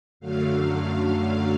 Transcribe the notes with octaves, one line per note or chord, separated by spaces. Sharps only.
F#2 D3 F#3 A3 F5